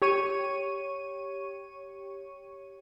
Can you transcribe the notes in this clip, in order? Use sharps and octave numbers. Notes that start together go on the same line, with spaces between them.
G4 C#5 C#6 D#7